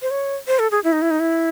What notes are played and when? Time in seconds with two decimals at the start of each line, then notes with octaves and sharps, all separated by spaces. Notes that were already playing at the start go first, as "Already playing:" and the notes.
0.02 C5
0.11 C#5
0.47 C5
0.59 A4
0.71 G#4
0.84 E4
0.92 D#4
1.02 E4
1.11 D#4
1.20 E4